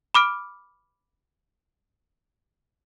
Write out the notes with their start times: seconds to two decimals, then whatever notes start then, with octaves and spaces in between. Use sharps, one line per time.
0.15 B5 D6 F6 D7